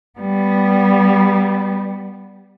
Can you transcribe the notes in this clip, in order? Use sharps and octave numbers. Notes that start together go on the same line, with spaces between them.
G3 B3